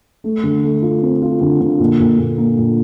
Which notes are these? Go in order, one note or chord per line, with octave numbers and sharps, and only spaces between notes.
A3
D3
A3
F4
C4
F4
D3
D3
A#2
A#2
A#2
A#3
A#2